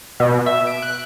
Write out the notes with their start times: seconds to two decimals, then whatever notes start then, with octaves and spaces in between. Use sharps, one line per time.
0.20 B2
0.46 E5
0.67 D7
0.82 F#6